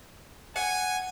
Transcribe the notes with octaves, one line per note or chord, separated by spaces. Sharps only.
F#5 G#5